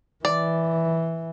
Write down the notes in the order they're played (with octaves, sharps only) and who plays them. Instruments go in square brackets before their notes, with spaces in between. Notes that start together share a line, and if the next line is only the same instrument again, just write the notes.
[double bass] E3 [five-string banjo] D5